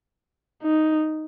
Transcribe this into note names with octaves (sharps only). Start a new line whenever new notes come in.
D#4